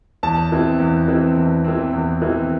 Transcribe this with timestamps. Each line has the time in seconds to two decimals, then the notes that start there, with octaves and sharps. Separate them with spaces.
0.23 E2 A5
0.52 E3 C4
0.80 E2
1.08 E3 C4
1.37 E2
1.64 E3 C4
1.93 E2
2.22 E3 C4